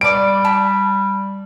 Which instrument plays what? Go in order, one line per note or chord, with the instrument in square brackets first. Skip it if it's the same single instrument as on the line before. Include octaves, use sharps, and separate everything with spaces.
[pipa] B2 D5 [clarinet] G3 [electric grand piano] D7
[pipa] A5 B5